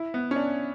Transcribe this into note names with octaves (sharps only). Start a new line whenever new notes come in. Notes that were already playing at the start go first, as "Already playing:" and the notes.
Already playing: E4
B3
C#4
D4